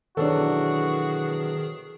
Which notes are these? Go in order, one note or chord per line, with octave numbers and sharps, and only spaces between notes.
B2 D#3 E3 F#3 D4 F#4 G#4 A4